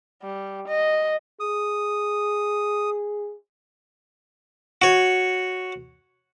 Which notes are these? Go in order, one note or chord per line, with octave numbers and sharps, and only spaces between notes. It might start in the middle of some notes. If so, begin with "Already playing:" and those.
G3
D#5
G#4 D#6
F#4 C#5